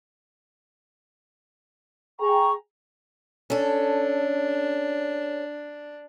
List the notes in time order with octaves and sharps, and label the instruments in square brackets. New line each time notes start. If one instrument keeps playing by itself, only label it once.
[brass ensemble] G#4 G5 A#5 [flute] C#6
[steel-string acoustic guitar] C#4 A4 [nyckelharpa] D4